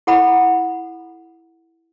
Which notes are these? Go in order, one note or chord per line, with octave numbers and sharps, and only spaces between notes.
E4 A4 F#5 A#5 B5